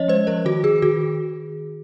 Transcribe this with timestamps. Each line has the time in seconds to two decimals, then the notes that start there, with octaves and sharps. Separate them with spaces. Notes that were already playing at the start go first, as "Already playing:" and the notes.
Already playing: F3 C#4 C#5 D#5
0.08 G#3 C5
0.27 F3 A#4
0.45 D#3 F#4
0.64 D#3 G#4
0.82 D#3 F#4